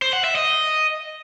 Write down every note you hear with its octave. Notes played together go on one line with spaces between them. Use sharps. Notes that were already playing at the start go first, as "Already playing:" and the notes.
C5
F#5
E5
D#5